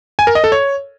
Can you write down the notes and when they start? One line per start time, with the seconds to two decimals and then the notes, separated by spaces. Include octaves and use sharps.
0.19 G#5
0.27 A#4
0.35 D#5
0.44 A4
0.52 C#5